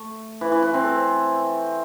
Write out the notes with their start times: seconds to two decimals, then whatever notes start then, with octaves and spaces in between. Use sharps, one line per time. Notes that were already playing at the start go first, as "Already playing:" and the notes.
Already playing: A3
0.41 E3
0.52 E3
0.62 E3
0.74 C4
0.84 A4